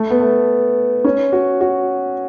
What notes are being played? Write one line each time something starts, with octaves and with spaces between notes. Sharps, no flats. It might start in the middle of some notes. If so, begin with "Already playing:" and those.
Already playing: A3
B3
A3
C#4
F#4
F#4